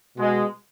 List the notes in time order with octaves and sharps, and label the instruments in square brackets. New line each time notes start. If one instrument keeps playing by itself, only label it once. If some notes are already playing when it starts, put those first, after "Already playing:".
[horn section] B2 G#3